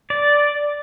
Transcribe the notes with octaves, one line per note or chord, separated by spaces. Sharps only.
D5